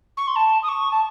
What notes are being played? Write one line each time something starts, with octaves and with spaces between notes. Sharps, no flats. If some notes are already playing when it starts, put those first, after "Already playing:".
C#6
C6
A5
D#6
C#6
A5